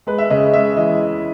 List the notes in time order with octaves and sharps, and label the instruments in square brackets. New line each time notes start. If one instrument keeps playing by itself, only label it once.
[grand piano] G#3 B4
E5
C#3 D#5
G#3 E5
E3 D#5